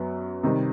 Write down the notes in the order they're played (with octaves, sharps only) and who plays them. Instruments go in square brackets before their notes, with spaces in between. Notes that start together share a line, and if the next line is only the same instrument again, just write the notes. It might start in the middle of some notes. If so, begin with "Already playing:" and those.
Already playing: [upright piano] F#2 F#3 B3
C3 D#3 G3